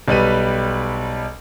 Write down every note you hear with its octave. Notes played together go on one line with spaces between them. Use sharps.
B1 G3 B4 D#7